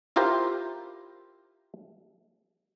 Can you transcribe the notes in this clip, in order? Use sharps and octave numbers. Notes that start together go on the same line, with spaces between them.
E4 F4 G4 A#4 C5